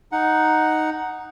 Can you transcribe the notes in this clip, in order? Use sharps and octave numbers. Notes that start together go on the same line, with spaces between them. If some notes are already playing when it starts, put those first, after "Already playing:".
D#4 F#5